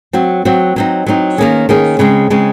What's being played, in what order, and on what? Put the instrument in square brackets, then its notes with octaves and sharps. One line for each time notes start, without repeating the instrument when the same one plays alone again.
[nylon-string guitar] F#3 C4 F#4
F#3 C4 F#4
F#3 C4 D#4
F#3 C4 D#4
D#3 A#3 C#4 G#4
D#3 A#3 C#4 G#4
C#3 G#3 C4
C#3 G#3 C4